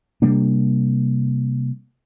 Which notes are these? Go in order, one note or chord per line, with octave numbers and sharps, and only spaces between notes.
C3 G3 A#3 D4